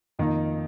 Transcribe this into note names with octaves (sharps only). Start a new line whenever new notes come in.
F2 D#3 A#3 D#4